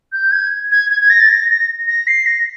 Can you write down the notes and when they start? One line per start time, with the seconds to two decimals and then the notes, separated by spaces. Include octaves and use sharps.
0.13 G6
0.31 G#6
0.71 G#6
0.90 G#6
1.01 G#6
1.10 A#6
1.20 A6
1.29 A#6
1.49 A#6
1.88 A#6
2.07 C7
2.26 A#6